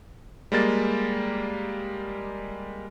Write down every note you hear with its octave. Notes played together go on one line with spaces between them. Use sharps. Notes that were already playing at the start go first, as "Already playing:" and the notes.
G3 G#3 A#3 A6